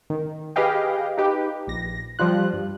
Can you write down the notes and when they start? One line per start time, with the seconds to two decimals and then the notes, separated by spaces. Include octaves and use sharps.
0.10 D#3
0.56 G4 G#4 B4 D#5 F5 G5
1.18 D#4 G4 B4
1.67 A#1 A#6
2.19 F3 G3 F4 F#6
2.53 G2